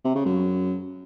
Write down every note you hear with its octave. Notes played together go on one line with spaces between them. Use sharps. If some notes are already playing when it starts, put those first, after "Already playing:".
C3
C#3
F#2